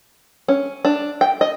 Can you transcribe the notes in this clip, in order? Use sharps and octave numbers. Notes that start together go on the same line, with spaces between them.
C#4
D4
G5
D#5